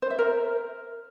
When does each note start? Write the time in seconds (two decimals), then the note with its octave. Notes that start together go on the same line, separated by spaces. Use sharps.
0.02 C5
0.10 E5
0.19 A#4